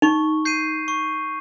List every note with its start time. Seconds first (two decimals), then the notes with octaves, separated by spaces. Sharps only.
0.02 D#4 C#6
0.45 G6 C7 D#7
0.88 C#6